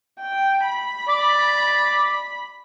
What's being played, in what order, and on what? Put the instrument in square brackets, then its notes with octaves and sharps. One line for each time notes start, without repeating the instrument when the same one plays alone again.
[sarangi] G5
B5
[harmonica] D5